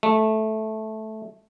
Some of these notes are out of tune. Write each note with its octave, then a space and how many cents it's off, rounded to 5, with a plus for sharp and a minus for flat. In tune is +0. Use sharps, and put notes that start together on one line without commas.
A3 -10